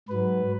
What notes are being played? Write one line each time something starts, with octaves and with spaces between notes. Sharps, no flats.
G#2 F#3 B4